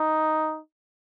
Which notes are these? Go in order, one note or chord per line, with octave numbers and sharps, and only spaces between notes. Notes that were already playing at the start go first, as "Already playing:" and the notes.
Already playing: D#4